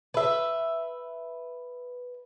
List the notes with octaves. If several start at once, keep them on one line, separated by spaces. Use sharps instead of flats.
B4 E5